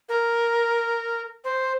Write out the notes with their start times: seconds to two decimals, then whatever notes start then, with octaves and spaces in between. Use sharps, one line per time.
0.09 A#4
1.44 C5